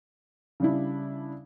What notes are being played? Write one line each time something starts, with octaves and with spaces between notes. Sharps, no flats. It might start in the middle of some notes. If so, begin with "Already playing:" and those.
C#3 G3 D4 E4